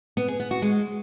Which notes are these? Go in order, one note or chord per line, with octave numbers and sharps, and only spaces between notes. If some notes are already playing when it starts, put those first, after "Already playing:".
B3
G#4
B3
F#4
G#3